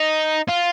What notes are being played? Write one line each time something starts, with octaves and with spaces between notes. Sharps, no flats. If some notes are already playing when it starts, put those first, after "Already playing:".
Already playing: D#4
F4